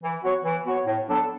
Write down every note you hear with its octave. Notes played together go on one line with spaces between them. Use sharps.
E3
B3 F#4 C#5
E3
B3 F#4 C#5
A2
F#3 B3 D4 A4